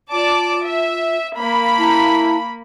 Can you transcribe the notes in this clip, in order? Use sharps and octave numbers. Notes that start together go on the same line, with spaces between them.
F4 D5 A5 D6
E5
A#3 B5
E4 A5 A#5